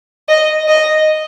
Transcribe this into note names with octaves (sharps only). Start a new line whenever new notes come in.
D#5
D#5